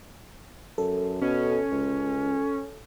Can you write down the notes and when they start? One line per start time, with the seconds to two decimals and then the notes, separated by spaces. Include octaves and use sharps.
0.78 F#2 A4
1.21 B2 C#4
1.71 C#2